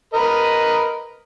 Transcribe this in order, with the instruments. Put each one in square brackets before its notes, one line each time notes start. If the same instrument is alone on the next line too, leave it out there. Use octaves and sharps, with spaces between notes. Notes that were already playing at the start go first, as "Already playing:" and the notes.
[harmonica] A#4 B4 D#5